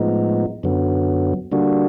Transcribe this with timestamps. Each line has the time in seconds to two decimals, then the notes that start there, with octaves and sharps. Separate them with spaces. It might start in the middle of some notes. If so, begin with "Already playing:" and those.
Already playing: A2 F3 G#3 B3 D#4
0.63 F#2 D3 F#3 B3
1.52 D3 G3 A#3 D4 F#4